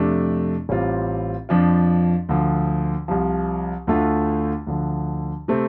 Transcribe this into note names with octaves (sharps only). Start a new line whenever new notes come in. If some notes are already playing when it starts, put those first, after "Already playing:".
Already playing: F2 C3 A3 D4
A1 A2 G3 C4 F4
F2 F3 D4 F4
D2 D3 F3
C2 C3 F3
D2 D3 A3 F4
D2 D3 F3
C3 A3 C4